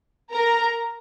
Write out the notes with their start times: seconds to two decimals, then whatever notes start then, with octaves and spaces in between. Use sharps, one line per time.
0.31 A#4 A#5